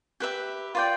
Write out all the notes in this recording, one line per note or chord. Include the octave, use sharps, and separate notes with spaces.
G4 B4 E5
F4 B4 D5 G5